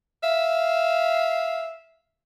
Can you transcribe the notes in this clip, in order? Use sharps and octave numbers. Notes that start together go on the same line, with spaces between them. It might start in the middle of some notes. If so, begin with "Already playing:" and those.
E5 F5